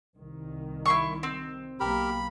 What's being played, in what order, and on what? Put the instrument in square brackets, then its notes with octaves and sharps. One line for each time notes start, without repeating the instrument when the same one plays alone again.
[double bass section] C2 D#3
[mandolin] E4 C6 C#6
C4
[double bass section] B1 A#3 [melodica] G4 A#4 [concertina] B5